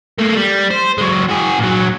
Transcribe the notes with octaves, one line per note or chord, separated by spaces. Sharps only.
A3 A#3
G3
C5
F#3 G#3
F#4 G#4
A#2 F#3